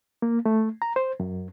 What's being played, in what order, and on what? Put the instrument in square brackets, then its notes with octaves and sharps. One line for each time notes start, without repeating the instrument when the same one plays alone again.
[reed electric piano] A#3
A3
A#5
C5
F#2